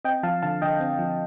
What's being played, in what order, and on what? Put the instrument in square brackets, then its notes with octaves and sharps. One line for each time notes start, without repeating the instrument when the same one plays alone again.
[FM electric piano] C4 D#5 G5
F3 F5 A5
D3 F5 A5
D3 D#5 G5
C4
F3